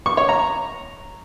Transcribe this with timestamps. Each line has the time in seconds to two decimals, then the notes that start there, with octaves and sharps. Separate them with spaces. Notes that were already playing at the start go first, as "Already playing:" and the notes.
0.06 C#6
0.17 C#5
0.29 A#5